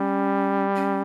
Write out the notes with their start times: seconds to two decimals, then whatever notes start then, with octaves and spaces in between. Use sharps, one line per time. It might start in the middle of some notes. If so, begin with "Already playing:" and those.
Already playing: G3 C#4
0.75 C#4